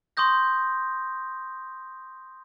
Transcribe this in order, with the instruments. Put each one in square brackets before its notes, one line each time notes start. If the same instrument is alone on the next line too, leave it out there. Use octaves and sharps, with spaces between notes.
[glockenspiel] C6 C#6 D#6 G6 A#6